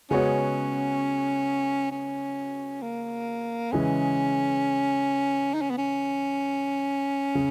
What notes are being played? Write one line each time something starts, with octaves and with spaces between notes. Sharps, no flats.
C#3 G#3 B3 C#4 F#4 C#5
C#4
A#3
C#3 E3 G#3 C#4
D#4
C#4
B3
C#4
C#3